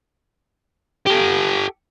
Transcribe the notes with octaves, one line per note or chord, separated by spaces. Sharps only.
G4 A4